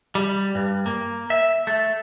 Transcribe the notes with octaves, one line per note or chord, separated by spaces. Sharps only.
G3
G2
A#3
E5
A3